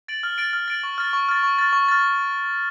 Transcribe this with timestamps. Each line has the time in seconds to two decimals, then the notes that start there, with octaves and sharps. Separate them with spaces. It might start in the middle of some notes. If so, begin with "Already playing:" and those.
0.08 A6 D7 F#7
0.23 F6
0.38 A6 D7 F#7
0.53 F6
0.68 A6 D7 F#7
0.83 C#6
0.98 F6 A6
1.13 C#6
1.29 F6 A6
1.43 C#6
1.58 F6 A6
1.73 C#6
1.88 F6 A6